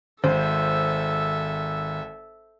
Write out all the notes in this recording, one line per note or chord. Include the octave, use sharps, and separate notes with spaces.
G#1 A4 C5 E5